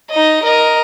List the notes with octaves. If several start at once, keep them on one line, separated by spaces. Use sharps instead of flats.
D#4 D#5
A#4 D#5